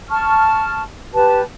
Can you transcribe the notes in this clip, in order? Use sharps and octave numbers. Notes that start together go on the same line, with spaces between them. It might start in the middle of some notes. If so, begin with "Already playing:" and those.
A5 C#6 F6
G4 B4 A5